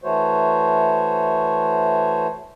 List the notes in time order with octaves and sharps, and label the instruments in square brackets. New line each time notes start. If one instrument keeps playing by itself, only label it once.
[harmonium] E3 A3 F#4 C5 C#5